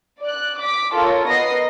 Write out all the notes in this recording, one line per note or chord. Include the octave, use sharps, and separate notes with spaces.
D5 F#6
D6 B6
F4 A4 A#4 C#5
B3 A#4 D#5 A#6 C7